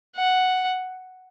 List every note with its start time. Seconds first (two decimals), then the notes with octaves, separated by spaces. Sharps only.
0.16 F#5